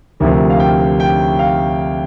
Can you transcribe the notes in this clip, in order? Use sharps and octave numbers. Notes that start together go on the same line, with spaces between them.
D2 C3 F3 A#4
F5
G5
G5
F5